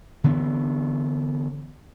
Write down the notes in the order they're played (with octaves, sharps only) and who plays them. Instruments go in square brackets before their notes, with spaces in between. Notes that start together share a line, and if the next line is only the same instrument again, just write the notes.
[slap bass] D3 E3 B3 D4